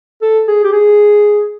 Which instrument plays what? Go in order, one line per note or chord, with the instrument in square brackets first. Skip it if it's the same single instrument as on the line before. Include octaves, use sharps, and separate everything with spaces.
[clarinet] A4
G#4
G4
G#4